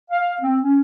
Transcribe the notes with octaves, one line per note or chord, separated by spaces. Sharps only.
F5
C4
C#4